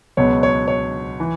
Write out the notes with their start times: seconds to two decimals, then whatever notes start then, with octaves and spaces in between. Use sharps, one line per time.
0.17 C#2 B2 F#3 B3 C#5
0.43 C#5
0.68 C#5
1.20 E3